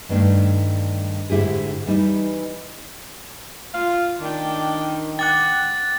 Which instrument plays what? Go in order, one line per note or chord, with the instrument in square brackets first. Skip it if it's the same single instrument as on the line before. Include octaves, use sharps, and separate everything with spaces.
[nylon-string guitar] G2 D#3 A3 D4
G#2 D3 E4 G4 G#4
E3 G3 D#4
[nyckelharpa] F4 [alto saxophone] F5
[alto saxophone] D#3 [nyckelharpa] D4 G5
[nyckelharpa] F#5 [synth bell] G5 D6 F#6 [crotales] A6